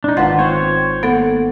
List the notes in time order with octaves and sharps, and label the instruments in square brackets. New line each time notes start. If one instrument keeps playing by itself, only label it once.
[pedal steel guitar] D4 D#4
[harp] G#1 [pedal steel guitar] F4 [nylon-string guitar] B4 A5 [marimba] F#5
[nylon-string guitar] D#3 C4 F4 [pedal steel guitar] C5 C#5 [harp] F#6
[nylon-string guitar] A#3 F#5 [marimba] B3 A4